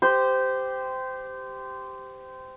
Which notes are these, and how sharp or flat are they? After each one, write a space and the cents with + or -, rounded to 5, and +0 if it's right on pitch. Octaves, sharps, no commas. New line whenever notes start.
G4 +0 C5 -20